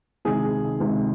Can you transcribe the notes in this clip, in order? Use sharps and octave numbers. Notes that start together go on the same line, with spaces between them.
C#2 C3 D#3 G#4
C#2 C3 D#3